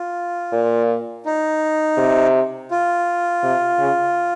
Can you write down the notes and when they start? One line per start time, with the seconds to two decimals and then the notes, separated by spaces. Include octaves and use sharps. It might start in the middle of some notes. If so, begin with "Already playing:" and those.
Already playing: F4
0.52 A#2
1.25 D#4
1.98 C3
2.71 F4
3.43 C3
3.79 C#3